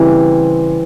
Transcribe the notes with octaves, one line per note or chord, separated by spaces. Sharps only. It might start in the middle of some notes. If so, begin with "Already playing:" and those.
Already playing: C#3 E3 G3 C4